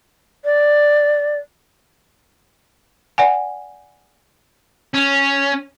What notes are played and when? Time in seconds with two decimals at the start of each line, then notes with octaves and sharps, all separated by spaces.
0.45 D5
3.18 D5 F#5 G#5
4.94 C#4